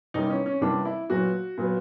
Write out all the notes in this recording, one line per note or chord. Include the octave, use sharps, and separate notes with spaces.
C3 E3 G3 A#3 C#4 D#4
C#4
C#4
C3 E3 G3 A#3 C#4 D4
E4
A#2 F#3 B3 F#4
A#2 F#3 B3